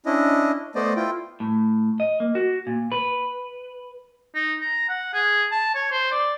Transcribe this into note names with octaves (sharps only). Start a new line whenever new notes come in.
C#4 D4 E4 D#5
A3 B3 C5 D5 D#5
E4 F4 G5
A2
D#5
A#3
F#4
A#2
B4
D#4
A#5
F#5
G#4
A5
C#5
C5
D5